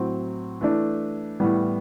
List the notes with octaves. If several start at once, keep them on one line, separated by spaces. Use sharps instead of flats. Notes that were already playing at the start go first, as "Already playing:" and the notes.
Already playing: A2 F#3 C4
E3 A3 D4
A2 E3 G3 B3